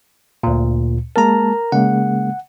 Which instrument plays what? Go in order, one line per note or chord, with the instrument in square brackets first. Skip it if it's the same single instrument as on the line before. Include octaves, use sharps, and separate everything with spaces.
[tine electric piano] D2 A#2
[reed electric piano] G#3 A#3 A5 [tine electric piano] A#4 A#5
[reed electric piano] C#3 G#3 A#3 [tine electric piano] F#5